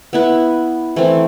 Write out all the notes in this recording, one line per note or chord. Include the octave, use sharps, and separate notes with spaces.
B3 E4 B4
E3 A3 C4